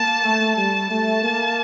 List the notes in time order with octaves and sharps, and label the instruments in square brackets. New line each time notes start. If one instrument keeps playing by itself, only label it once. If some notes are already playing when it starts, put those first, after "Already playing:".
Already playing: [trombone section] A#3 [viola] A5
[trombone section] A3
[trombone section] G3 [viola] A5
[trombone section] A3
A#3